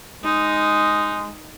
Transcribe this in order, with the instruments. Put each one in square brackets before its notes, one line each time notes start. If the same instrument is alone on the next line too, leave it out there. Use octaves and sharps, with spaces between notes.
[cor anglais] G#3 [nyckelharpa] D#4